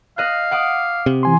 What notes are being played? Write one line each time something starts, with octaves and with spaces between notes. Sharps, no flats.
D#5 F5 F#6
F#5 D6 D#6
C3
E3 G#5 C6